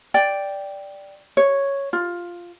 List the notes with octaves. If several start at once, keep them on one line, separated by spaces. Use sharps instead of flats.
D5 G5
C#5
F4